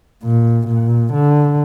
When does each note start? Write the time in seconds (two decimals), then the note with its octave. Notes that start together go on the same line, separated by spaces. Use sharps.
0.24 A#2
0.68 A#2
1.13 D3